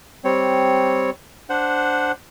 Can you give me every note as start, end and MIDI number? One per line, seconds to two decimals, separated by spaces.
0.24 1.10 55
0.24 1.10 60
0.24 1.10 73
1.50 2.12 62
1.50 2.12 72
1.50 2.12 78